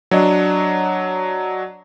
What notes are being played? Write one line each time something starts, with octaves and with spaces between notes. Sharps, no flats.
F#3 D4 C#5 D#5